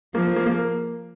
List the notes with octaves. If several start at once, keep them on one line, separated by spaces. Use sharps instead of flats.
F3 A#3
A#3
A#3